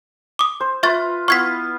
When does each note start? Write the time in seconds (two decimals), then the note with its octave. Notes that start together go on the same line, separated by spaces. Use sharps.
0.39 D6 D#6
0.60 C5
0.83 F4 B4 E5 C#6 A6
1.28 B3 E4 F5 C#6 G#6 B6